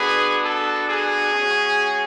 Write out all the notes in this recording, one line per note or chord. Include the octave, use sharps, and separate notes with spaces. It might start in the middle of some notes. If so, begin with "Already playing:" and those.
Already playing: B3 D4 F#4 G#4 B4
A4
G#4
G#3 C#4 F#4